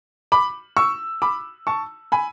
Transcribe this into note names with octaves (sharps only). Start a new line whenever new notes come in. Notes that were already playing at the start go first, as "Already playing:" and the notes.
B5 D6
C#6 E6
B5 D6
A5 C#6
G#5 B5